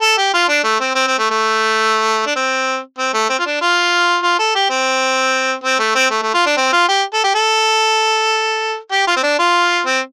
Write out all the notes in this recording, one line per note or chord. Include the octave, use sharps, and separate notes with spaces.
A4
G4
F4
D4
A3
C4
C4
C4
A3
A3
D4
C4
C4
A3
C4
F4
D4
F4
F4
A4
G4
C4
C4
A3
C4
A3
A3
F4
D4
C4
F4
G4
A4
G4
A4
G4
F4
C4
D4
F4
C4